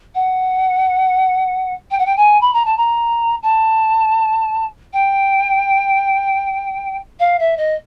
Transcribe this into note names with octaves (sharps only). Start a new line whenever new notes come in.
F#5
G5
F#5
G5
G#5
B5
A#5
A5
A#5
A5
G5
F5
E5
D#5